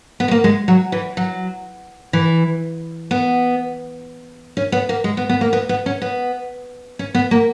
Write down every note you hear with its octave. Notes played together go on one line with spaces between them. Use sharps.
B3
G#3
A#3
G#3
F#3
E3
F#3
E3
B3
C#4
B3
A#3
G#3
B3
B3
A#3
B3
B3
C#4
B3
C#4
B3
A#3